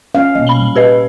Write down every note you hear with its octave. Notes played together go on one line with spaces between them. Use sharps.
C#4 F5
B2 A#3 D#5
B5 F#7 G7
C2 A#2
G4 B4 D#5